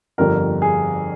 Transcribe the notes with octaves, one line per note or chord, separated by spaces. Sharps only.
G1 F2 D3 G3 A#4
G#4